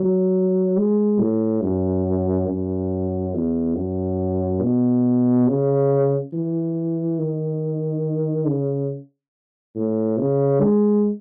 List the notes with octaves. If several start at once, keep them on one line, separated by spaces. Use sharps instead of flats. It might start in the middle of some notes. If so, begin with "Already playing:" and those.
Already playing: F#3
G#3
A2
F#2
F#2
E2
F#2
B2
C#3
E3
D#3
C#3
A2
C#3
G#3